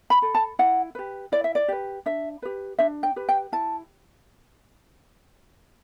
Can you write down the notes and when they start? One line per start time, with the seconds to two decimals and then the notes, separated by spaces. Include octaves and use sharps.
0.10 B5
0.22 A4
0.35 A5
0.59 E4 F#5
0.95 G4 B4
1.32 E4 D5
1.44 E5
1.55 D5
1.68 G4 B4
2.06 D4 E5
2.42 G4 B4
2.79 D4 E5
3.03 G5
3.16 G4 B4
3.29 G5
3.52 E4 A5